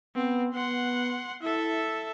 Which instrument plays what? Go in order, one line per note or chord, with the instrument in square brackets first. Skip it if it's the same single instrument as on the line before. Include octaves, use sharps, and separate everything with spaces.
[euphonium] B3 [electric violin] C4
[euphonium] B3 [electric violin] F#5 C6
[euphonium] E4 [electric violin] A4 E5